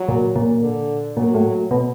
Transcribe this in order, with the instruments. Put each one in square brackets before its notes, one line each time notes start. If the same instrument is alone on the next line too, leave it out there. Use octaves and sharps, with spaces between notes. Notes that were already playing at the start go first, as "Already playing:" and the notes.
Already playing: [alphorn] F#3
[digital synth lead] A#2
A#2
[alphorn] D3
[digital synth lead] A#2 [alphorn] F#3
[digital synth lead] A2
B2